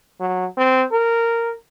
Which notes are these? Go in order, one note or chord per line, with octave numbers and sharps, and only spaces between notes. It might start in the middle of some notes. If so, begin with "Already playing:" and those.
F#3
C4
A#4